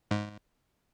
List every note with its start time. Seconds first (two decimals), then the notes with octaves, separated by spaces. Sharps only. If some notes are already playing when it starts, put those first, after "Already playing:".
0.11 G#2